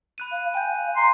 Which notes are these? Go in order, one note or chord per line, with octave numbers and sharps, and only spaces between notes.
B5 F#6 D#7
F5
G5 G#5 G6
F5
A#5 C6